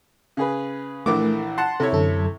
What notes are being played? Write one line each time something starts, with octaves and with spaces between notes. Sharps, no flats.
C#3 G#4 B4
A#1 E3 A3 A#4 D6
F#5 A5 C6
C3 E4 A4 C#5
F#2 D3 A4